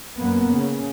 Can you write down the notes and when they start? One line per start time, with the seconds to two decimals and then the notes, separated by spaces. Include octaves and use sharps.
0.18 F#2 A#3 B3
0.53 C#3